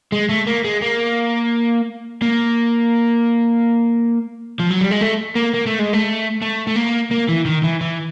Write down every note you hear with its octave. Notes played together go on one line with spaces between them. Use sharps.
G#3
A3
A#3
G#3
A#3
A#3
F3
F#3
G3
G#3
A3
A#3
A#3
A3
G#3
A3
A3
A3
A#3
A#3
E3
D#3
E3
E3